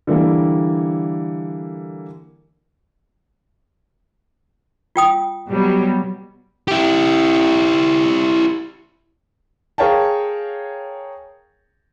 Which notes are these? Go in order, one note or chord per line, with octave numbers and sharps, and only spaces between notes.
D3 E3 G3 A#3
F4 G5 D#6
B2 F#3 G3
E4 G4
G#4 A#4 C#5 F5 G5 A5